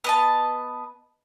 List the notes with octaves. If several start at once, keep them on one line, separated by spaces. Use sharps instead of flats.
B3 D#5 A5